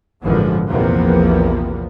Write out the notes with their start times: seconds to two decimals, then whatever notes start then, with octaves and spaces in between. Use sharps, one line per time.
0.22 G#1 F#2 A#2 D3 E3 F3
0.67 A#1 E2 C3 F3 A#3 B3